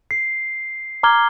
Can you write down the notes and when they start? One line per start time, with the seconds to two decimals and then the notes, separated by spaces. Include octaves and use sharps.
0.11 C7
1.03 A#5 D6 F6 G#6 G7